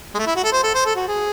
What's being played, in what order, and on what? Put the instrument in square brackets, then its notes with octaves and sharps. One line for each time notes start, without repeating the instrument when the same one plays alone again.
[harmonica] G#3
A3
E4
F#4
A4
C5
A4
C5
A4
F#4
G#4